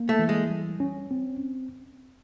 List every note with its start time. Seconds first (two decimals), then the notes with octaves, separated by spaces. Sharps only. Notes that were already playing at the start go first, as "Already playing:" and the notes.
Already playing: A#3
0.09 A3
0.19 E3
0.29 G#3
0.50 G3
0.80 C#4
1.11 C4